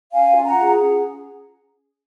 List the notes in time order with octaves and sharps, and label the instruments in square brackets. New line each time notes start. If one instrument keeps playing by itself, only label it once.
[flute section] C#4 F5 G#5
F4
F#5 A#5
G#4
C#4